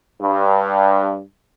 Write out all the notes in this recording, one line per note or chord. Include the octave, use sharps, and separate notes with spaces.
G2